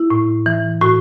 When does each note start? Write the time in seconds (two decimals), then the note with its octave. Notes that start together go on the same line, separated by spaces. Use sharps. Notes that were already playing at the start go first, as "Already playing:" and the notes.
Already playing: E4
0.10 A2
0.46 E3
0.81 A2 F#4